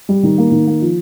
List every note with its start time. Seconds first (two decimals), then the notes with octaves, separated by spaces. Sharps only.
0.09 G3
0.23 D#3
0.38 A#3
0.52 D#3
0.67 A#3
0.82 F3